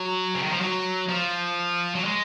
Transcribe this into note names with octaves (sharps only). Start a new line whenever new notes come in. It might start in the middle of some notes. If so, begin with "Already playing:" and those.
Already playing: F#3
C#3
D#3
F3
F#3
F3
F#3
G#3